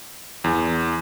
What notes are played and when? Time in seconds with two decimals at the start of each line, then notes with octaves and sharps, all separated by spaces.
0.44 E2